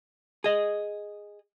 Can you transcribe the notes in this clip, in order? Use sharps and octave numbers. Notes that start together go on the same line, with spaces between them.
G#4 D#5